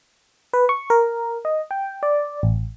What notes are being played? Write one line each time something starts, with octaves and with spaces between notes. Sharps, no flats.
B4
C#6
A#4
D#5
G5
D5
A1